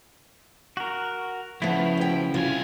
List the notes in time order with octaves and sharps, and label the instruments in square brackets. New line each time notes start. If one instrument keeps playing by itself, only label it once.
[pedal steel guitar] F#4 A#4
[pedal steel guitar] C#3 E4 [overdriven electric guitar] F3 [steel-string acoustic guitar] A3 B3
[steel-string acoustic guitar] D2 G5
[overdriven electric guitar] C2 G#5 [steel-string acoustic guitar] F4